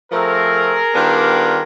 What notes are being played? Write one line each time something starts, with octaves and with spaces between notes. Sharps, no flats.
F3 A3 C4 G#4 A#4
D#3 G3 B3 D4 F4